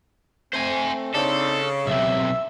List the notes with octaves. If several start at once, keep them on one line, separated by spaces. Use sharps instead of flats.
A3 C4 C5 G#5
C#3 C4 D4 D#4 A4
B1 C3 E5